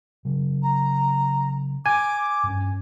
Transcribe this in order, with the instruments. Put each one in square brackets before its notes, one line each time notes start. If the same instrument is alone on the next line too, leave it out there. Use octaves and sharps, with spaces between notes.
[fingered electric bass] C#3 F#3
[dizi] A#5
[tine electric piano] G#5 [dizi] D6
[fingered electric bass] G2 C#4